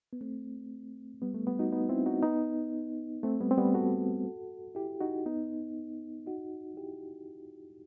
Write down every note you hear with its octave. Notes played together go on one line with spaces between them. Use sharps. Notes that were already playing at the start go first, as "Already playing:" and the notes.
B3
A3 C4
G3 B3
A3
G3 B3
D#4 F#4
B3 D#4
C4 E4
D#4 F#4
B3 D#4
A3 C4
G3 B3
C4
G3 B3
F#4 A4
E4 G4
D#4 F#4
B3 D#4
D#4 F#4
E4 G4